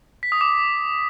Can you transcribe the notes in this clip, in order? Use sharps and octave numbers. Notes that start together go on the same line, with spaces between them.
B6
D#6
D6